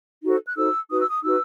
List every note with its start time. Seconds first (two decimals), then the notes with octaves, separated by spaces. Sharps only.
0.23 D#4 F#4 A4 C5
0.45 F#6
0.56 D#4 F#4 A4 C5 E6
0.90 D#4 F#4 B4 D#6
1.00 E6
1.09 D#6
1.23 D#4 F#4 B4 E6